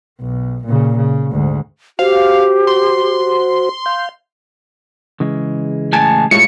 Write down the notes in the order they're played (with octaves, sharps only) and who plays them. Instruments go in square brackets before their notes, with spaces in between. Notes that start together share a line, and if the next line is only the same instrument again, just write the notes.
[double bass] B1
A#2 C#3
C#3
D2 G#2
[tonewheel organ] F#4 C5 [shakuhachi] G4 [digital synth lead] F5
[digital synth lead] C6
[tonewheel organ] F5 G6
[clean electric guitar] C#3 E3 G#3
[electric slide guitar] A2 G#5 A5
[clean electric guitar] A2 G3 G#3 [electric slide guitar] E4 F4 C#5 [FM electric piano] C#7